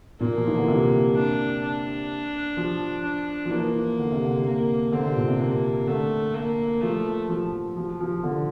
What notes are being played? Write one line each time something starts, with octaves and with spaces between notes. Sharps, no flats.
A#2 A#3
F3
E3
D3
C3
D4
D4
F3
D4
F3
E3 A#3
D3
C3
D3
A#3
D3 C4
C3
A#2
C3
A#3
D3 A3
A#3
F3 A3
F3
F3
F3
D3